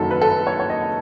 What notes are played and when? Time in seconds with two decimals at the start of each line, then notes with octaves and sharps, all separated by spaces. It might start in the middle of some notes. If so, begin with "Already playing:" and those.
Already playing: F#1 F#2 D#3 F#3 A4
0.11 B4
0.22 A4
0.29 B4
0.47 C#5
0.60 C#5
0.70 D#5